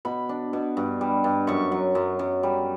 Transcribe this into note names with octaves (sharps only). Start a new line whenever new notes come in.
B2 B5
D4
B2
G2
G3
G2
F#2 C#6
F#3
F#2
F#2
G3